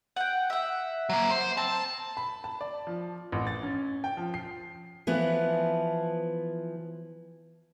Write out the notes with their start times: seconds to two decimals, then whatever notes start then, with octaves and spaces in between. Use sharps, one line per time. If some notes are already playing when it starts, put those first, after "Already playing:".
0.16 F#5 G5
0.50 E5 F#5
1.09 F#3 A#3
1.31 C5
1.57 C4 A5
2.17 B5
2.44 A5
2.61 D5
2.87 F3
3.32 A1
3.47 A6
3.63 C#4
4.04 G5
4.17 F3
4.34 C7
5.07 E3 F3 B3